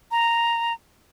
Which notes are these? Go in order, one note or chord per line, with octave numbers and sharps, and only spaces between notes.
A#5